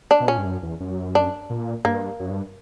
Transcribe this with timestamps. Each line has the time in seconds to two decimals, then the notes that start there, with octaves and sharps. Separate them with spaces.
0.11 D4
0.20 B2
0.28 A#2 C#4
0.38 G2
0.45 F#2
0.63 E2
0.80 F#2
1.15 D4
1.50 A#2
1.84 G2 A#3
2.20 F#2
2.30 G2